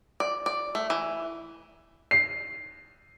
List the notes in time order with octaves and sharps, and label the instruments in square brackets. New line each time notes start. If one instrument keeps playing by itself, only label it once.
[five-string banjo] D5
D5
A3
E3
[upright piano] C7